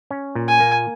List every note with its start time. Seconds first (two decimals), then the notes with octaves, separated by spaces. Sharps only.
0.11 C#4
0.35 A#2
0.48 G#5
0.60 A#3